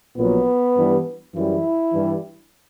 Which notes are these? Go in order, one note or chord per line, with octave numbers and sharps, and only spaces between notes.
A#1 A#2 F#3 B3
G2 E3 G3
F#2 E3 G3 E4
G2 E3 G3